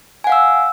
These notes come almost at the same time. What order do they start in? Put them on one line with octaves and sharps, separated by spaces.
G#5 F#5 F5 E6